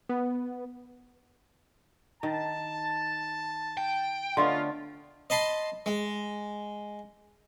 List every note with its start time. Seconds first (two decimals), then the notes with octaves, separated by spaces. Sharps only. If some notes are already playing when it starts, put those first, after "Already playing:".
0.09 B3
2.23 D#3 A5
3.77 G5
4.37 D3 A3 B3 C#4 F4 B4 D#5 C6
5.30 D#5 A5 B5 C6
5.86 G#3